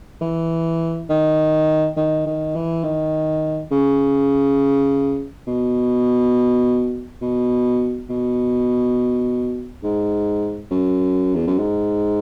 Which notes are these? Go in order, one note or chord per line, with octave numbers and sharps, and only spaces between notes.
E3
D#3
D#3
D#3
E3
D#3
C#3
B2
B2
B2
G#2
F#2
E2
F#2
G#2